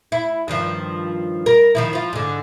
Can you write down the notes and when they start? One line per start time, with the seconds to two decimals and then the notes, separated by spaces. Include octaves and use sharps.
0.12 E4
0.48 G2 D#3 F3
1.46 A#4
1.75 D#3 F3 E4
1.93 F3 F4
2.13 G#2 D3